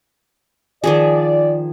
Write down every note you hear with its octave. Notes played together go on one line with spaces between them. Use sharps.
D#3 F3 G#4 D5